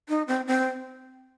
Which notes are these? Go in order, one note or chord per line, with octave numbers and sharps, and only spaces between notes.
D#4
C4
C4